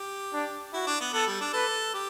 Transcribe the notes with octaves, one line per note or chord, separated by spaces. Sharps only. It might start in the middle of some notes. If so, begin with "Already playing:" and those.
Already playing: G4
D4
E4 F#4
D4
B3
B3 A4
G3
D4
A4 B4
G4